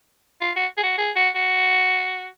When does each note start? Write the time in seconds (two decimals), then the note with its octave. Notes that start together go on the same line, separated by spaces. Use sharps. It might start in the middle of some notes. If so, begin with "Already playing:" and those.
0.41 F4
0.56 F#4
0.77 G#4
0.83 F#4
0.98 G#4
1.16 F#4
1.35 F#4